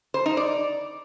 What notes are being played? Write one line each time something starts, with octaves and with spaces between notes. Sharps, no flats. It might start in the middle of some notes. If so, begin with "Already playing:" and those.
C5
D#4
D5